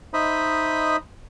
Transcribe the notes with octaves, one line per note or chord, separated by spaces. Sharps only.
D#4 C5 D#5 E5 B5 D#6